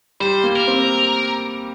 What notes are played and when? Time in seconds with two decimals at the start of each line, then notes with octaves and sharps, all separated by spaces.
0.20 G3 C5
0.44 A#3
0.56 A#4
0.68 C4